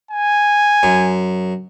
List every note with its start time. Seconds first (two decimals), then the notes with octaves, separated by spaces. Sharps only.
0.11 G#5
0.83 F#2